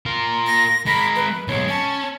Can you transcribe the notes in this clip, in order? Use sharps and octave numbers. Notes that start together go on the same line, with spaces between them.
F4 A#4
A#6
G#3 A#4 B5
B4
B1 G#3 C#5
C#4 A5